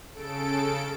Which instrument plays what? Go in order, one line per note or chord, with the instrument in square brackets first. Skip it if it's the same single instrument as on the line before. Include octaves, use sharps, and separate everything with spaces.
[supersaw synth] C#3 A4 D7